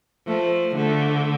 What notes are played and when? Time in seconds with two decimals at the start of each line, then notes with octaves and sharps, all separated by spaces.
0.27 F3 A3
0.76 D3 A3